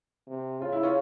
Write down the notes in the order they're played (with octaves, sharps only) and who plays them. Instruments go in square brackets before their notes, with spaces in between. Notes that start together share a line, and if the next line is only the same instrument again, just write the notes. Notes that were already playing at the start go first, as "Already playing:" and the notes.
[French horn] C3
[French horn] C#3 [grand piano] F4
[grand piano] E4
C#4 F4